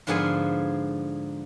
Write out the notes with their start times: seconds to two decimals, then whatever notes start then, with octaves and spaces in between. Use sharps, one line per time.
0.07 G#2 D3 F3 B3 G#4 G#5